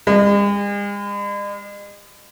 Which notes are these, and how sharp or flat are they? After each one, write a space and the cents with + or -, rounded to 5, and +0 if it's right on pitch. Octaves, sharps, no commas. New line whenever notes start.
G#3 -45